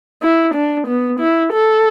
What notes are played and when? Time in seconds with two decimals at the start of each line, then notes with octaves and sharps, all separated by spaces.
0.23 E4
0.54 D4
0.87 B3
1.20 E4
1.53 A4